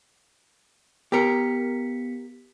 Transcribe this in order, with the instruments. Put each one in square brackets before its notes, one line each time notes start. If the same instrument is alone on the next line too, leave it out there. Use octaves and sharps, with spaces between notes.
[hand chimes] B3 B6 C#7 [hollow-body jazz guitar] G4 A#4